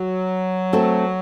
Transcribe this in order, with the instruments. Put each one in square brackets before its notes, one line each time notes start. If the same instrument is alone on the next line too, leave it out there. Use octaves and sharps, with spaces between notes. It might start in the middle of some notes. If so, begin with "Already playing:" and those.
Already playing: [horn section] F#3
[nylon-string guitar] A3 C4 F#4 A4